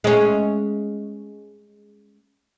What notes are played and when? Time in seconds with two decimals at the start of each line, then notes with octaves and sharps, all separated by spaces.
0.04 G#3 C#4